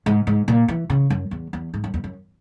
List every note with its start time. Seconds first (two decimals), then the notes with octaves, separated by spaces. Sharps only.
0.06 G#2
0.27 G#2
0.48 A#2
0.68 E3
0.90 C#3
1.10 F#2
1.31 E2
1.53 E2
1.74 G#2
1.84 F#2
1.94 E2
2.04 F#2